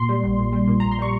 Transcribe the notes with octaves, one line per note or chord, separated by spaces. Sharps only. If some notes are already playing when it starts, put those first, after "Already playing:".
Already playing: A#2 C6
G3
A#1
A#1
G3
A#2
A#1 A#5
C6
G3 C#6